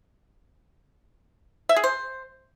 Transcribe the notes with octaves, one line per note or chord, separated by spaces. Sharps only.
E5
G#4
C5